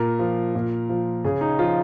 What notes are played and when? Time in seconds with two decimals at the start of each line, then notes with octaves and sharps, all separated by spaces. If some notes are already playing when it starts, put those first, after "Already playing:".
Already playing: A#2 A#4
0.19 F3
0.55 A#2
0.89 F3
1.24 C#3 G#4
1.41 D#4
1.59 F3 F4